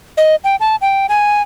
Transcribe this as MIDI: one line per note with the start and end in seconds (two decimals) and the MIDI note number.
0.17 0.36 75
0.44 0.56 79
0.60 0.76 81
0.81 1.06 79
1.09 1.42 80